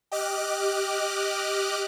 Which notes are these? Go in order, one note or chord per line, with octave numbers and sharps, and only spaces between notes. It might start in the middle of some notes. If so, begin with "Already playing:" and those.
G4 D#5 D6 F6 F#6